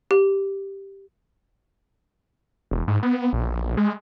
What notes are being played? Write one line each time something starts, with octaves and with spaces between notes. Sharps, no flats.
G4
E1
G#2
B3
A#1
G#3